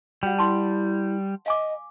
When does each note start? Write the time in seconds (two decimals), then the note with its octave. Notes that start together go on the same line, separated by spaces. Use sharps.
0.23 G3 F#4 F#5 G5
0.38 E4 A5 C6
1.46 D#5 F5 G#5 D6